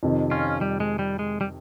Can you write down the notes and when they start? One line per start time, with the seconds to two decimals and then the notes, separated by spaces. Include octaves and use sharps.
0.03 F2 C3 D#3
0.31 C#4 F4
0.61 G3
0.80 G#3
0.99 G3
1.19 G#3
1.41 G3